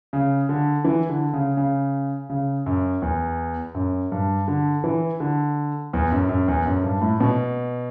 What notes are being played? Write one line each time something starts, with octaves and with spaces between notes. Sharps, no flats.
C#3
D3
E3
D3
C#3
C#3
C#3
F#2
E2
F#2
G2
D3
E3
D3
E2
F#2
F#2
E2
F#2
G2
A2
B2